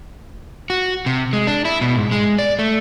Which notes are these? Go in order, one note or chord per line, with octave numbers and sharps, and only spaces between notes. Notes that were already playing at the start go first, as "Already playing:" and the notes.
F#4
C3
G#3
D4
E4
B2
G#2
G#3
D5
A3